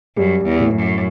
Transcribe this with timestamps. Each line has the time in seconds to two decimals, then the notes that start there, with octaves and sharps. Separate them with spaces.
0.17 F#2 G3
0.46 E2
0.60 A2
0.75 F#2